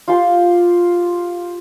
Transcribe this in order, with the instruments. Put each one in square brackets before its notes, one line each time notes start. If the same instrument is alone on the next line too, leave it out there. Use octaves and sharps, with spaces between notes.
[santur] F4 G4 F5 C6